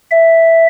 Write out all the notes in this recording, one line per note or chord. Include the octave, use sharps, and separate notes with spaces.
E5